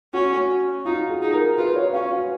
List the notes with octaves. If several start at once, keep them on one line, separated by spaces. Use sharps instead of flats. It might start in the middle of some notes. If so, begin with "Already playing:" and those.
C#4 F#4
D#4 F4
G#4
D#4
A#4
F4 B4
C#5
C#4 F5
F#4